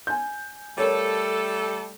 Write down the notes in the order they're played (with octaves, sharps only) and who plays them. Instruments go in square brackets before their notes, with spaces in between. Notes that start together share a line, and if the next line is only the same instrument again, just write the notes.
[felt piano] G#5 G6
[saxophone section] G3 A3 A4 [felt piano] A#4 C#5